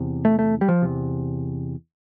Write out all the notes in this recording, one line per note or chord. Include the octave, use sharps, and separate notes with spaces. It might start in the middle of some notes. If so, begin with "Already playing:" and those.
Already playing: E2 C3
A3
A3
G3
F3
E2 C3